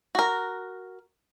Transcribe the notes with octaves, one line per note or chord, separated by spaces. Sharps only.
F#4 A#4